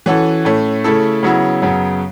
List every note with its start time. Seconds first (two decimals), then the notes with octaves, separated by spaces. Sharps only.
0.06 E3 C#4 F#4 A4
0.45 A2 A3 C#4
0.84 C#3 A3 E4 A4
1.23 C#3 F#3 B3 E4
1.62 F#2 C#3 F#3 B3